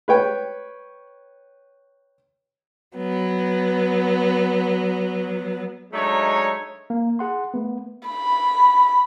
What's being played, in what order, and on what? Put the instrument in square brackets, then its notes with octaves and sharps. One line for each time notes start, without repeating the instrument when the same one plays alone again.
[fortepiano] B4 C#5 G5
[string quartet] F#3 B3
[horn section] F#3 G#3 A3 D4 D#4 C#5
[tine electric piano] A#3
G#4 F#5 C6
A3 B3
[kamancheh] B5